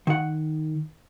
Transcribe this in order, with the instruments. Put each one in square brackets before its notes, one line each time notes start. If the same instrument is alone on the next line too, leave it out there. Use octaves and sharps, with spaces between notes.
[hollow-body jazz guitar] D#3 F#5